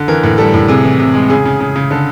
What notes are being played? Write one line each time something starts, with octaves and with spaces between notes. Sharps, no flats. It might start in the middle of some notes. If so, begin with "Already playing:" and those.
Already playing: D3
E3 A#4
A2
G3 A4
A2
C3 G#4
E3
C3
G#3
C#3 G#4
C#3
C#3
C#3
D3 A4